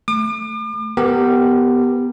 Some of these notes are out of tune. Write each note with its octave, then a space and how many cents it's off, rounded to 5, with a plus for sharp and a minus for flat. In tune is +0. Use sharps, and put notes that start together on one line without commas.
A3 +0 D6 +40
B3 +0 G4 +0 A#4 -25